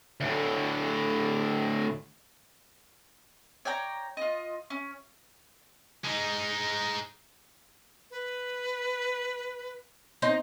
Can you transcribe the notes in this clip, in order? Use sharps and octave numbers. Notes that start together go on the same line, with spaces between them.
D2 A2
C#5 D5 G5 A#5
F4 D#5
C#4
G#3 D#4
B4
C4 D#4 D#5